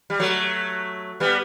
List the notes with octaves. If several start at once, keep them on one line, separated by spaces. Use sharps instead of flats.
G3
F#3 A3
G3 B3